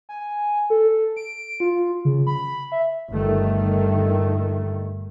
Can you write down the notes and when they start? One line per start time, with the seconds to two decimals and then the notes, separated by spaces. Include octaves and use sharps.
0.09 G#5
0.70 A4
1.17 D7
1.60 F4
2.05 C#3
2.27 B5
2.72 E5
3.12 G1 D#3 A3